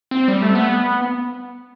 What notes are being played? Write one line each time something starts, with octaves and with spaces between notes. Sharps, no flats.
C4
G3
A3
B3